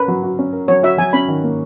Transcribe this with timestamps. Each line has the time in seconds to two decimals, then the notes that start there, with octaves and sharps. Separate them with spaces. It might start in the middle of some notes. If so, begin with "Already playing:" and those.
Already playing: C#4 A#4 B4
0.08 F#3
0.23 F#4
0.39 C#4
0.53 A#4
0.68 F#3 C#5
0.83 F#4 E5
0.98 F#3 G#5
1.13 C#4 B5
1.28 D#3
1.44 A#3